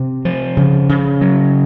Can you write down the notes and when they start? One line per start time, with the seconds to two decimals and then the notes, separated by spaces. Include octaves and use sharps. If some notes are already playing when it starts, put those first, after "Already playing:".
Already playing: C3
0.25 F3
0.57 C#3
0.89 C#3
1.21 F#3